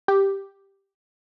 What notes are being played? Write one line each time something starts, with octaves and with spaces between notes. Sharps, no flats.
G4